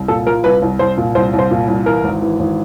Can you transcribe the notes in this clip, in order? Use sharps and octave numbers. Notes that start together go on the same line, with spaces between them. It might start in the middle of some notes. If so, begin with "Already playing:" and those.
Already playing: C2
A#2 A4
F3 A#4
C2 B4
C2
C2 C5
A#2
C2 C5
C2
C5
A#2
C2
E3 A#4
G#1
E3
G#1